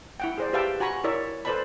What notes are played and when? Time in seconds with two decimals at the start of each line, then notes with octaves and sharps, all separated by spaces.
0.20 E4 F#5 G5
0.38 G#4 C5 D5
0.53 G4 B4 E5 F5 G5 A5
0.80 F#4 G#5 A#5 B5 C#6
1.04 E4 A#4 C#5 D5 E5
1.45 A4 B4 C5 D5 A5 B5